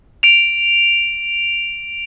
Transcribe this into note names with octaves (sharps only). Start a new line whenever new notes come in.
D7 F7